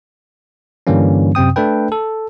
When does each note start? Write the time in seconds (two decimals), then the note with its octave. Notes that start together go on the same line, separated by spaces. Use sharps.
0.87 G2 D3 E3 G3 A#3 C#4
1.35 F#2 C3 C4 G5 D#6
1.56 A3 D4 A4 B4 G5
1.92 A4